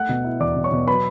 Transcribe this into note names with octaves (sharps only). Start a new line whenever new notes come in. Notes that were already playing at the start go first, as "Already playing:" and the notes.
Already playing: A3 F#5 F#6
B2
E4
E2 D5 D6
B2
C#5 C#6
B2
F#3 B4 B5